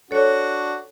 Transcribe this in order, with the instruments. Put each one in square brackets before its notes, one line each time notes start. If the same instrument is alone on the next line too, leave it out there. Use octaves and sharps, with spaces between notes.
[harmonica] D4 F#4 [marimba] A4 C#5